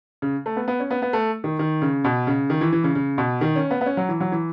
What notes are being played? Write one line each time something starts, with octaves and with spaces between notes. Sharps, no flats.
C#3
A3
B3
B3
C#4
B3
B3
A3
D#3
D#3
C#3
B2
C#3
D#3
E3
E3
C#3
C#3
B2
D#3
C#4
B3
B3
C#4
F#3
E3
F#3
E3